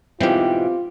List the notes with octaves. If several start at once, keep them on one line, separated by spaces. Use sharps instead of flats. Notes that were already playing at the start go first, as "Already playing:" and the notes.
G#2 B2 E3 C4 F4 G4